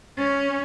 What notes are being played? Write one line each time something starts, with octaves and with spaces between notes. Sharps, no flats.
C#4